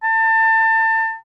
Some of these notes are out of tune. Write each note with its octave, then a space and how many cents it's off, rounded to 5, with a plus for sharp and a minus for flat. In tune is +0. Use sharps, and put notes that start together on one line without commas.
A5 +30